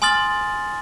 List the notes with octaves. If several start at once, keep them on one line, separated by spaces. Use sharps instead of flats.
G#5 C6 D#6 F6 A6 F#7